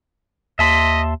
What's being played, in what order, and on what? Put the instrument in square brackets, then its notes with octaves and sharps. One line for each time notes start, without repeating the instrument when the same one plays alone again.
[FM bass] D#2 [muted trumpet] D#5 [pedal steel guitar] E5 A5 C6 [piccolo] B6